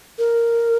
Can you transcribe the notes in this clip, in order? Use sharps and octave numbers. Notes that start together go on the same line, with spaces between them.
A#4